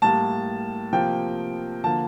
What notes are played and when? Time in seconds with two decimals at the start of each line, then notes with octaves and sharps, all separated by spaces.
0.02 A2 G3 A#3 A5
0.92 C3 F3 A#3 G5
1.84 D3 F3 A#3 A5